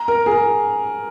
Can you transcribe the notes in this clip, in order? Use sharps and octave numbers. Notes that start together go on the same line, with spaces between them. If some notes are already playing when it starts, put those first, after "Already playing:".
Already playing: A#5
A#4
G#4
A#4